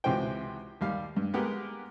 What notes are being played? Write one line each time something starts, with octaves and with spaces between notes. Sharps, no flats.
C#2 C3 E3 F#4 C5 G5
D#2 G3 F5
G2
G#3 A#3 B3 G4 A#4 F#5